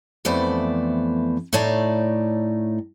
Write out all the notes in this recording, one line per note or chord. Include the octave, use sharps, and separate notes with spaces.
F2 E3 A3 B3 C5 D5
A2 A3 D#4 C#5 D5 A5